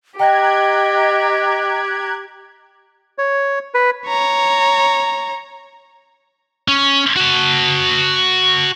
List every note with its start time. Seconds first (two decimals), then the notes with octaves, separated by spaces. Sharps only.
0.20 G4 D#5 G5 A#5 F#6 G#6
3.18 C#5
3.74 B4
4.07 C#5 A#5
6.68 C#4
7.17 F#4 A5